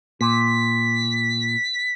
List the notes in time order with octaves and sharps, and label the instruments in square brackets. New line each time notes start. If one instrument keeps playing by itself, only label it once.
[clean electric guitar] A#2 [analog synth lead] B6